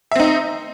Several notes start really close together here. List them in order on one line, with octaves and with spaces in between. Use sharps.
E5 C4 D#4